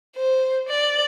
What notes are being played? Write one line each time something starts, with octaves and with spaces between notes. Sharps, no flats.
C5
D5